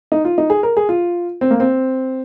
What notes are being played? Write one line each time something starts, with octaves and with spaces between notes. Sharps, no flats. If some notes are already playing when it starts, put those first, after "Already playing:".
D#4
F4
D#4
G#4
A#4
G#4
F4
C4
A#3
C4